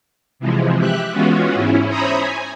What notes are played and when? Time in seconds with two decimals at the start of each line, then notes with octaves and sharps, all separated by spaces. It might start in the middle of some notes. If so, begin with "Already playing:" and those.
0.39 C3 E3 F3 G#3
0.78 G4 E5 F#6
1.11 E3 G#3 B3 C#4 F4 F#4
1.54 G#2 C#4 E4
1.88 C5 C#5 E5 A#5 B5 D#6
2.16 G#5